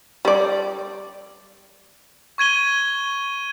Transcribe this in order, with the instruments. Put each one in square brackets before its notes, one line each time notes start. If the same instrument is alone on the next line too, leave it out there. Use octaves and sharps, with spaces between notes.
[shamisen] G3 D5
[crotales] C#6 G#6 D#7 G7